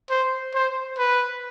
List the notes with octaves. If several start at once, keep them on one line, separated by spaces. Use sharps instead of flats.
C5
C5
B4